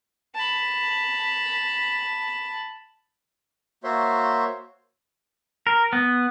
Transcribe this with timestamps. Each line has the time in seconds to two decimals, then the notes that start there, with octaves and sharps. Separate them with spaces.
0.35 A5 B5
3.84 A#3 F#4 C5 C#5 E5 C6
5.67 A#4
5.93 B3